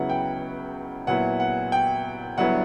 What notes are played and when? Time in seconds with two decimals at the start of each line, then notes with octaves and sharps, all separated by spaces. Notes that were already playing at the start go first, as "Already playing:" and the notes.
Already playing: C#2 C#3 F#3 B3 E4 F#5
0.09 G5
1.07 A#2 F#3 B3 E4 F#5
1.40 F#5
1.72 G5
2.38 G1 G2 F#3 B3 E4 F#5